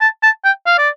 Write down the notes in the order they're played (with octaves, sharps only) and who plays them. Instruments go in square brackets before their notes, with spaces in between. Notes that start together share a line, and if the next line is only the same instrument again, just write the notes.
[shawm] A5
A5
G5
F5
D5